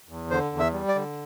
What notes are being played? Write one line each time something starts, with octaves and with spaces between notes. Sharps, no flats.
E2
D3 C5
E2
E5
G3
D5
D3